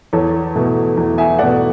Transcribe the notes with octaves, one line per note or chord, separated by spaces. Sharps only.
E2 A4 C#5
B2 A3
E2
E5 G#5
B2 A3 D5 F#5